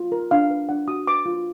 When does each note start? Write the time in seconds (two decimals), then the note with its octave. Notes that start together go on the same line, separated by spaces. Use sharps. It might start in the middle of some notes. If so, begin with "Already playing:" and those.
Already playing: F4
0.12 A#4
0.31 D4 F5
0.51 B4
0.69 D4 F#5
0.88 F#4 D#6
1.07 B4 D6
1.26 F4